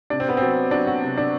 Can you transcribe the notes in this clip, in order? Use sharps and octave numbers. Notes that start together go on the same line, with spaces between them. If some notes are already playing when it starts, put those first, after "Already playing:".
C3 D4
C4
B3
F#3 C4
F#3 D4
F#4
C3
D4